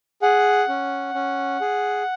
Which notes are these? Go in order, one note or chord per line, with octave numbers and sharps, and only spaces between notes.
G#4 F#5
C#4
C#4
G#4